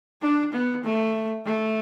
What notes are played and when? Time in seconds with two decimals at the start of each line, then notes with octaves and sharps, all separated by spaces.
0.22 D4
0.53 B3
0.84 A3
1.46 A3